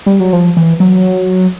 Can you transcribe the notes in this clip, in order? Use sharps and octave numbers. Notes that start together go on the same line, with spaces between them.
G3
F#3
F3
E3
F#3